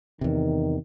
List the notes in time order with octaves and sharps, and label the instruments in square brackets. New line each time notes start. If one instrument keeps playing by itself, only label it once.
[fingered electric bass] E2 C3 [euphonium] D#3